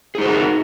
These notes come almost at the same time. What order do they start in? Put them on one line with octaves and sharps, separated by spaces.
G#4 D#4 C5 F#4 A#4